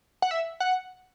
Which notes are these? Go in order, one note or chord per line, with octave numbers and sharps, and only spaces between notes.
F#5
E5
F#5